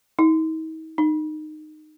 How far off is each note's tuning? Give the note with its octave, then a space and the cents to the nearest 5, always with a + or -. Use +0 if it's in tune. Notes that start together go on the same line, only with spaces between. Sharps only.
D#4 +45
D#4 -20